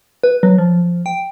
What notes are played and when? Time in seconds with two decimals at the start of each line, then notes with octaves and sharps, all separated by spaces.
0.23 B4
0.43 F#3
0.58 F3
1.06 G5